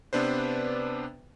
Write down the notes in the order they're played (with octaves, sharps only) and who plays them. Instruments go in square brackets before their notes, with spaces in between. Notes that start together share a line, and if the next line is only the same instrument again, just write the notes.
[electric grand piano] C3 B3 D4 B4 C5